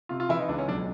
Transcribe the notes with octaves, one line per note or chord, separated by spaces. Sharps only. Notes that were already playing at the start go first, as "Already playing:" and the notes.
C3 F4
F4
E3 E4
D#4
C#2 D4
C#4
B1 D4